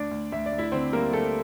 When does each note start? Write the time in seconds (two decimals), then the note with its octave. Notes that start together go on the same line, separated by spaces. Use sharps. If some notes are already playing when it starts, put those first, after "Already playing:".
Already playing: D2 D4 D5
0.11 D2
0.32 D2 E5
0.46 D5
0.52 D2
0.58 E4 E5
0.72 D3 C4 C5
0.93 G3 A#3 A#4
1.13 G3 A3 A4